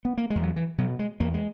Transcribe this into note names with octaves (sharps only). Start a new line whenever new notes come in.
B3
A#3
G#3
E2
F#3
E3
B2 F#3
G#3
E2 A#3
G#3